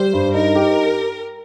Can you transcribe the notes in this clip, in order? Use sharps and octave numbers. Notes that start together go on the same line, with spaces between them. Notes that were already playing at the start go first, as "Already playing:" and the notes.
Already playing: G3 C5
G2
D#4 A#4
G4